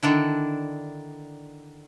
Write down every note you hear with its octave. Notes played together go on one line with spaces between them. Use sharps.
D3 D#3 D4 E4